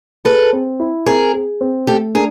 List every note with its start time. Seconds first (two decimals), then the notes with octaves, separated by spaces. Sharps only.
0.25 G#4 A4 B4
0.53 C4
0.80 E4
1.06 C4 G#4 A#4
1.34 G#4
1.61 C4
1.87 A3 G4 A4
2.15 D4 G#4 A#4